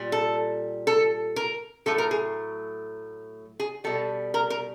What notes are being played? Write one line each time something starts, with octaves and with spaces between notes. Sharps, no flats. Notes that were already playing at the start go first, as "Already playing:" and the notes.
Already playing: A#2 G3
A4
A4
A#4
A2 F#3 A3 A4
A#4
G#4
G#4
B2 G3 A4
A#4
A#4